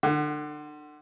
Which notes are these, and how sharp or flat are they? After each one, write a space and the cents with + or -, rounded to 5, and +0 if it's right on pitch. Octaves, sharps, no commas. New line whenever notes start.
D3 +35 F#5 +0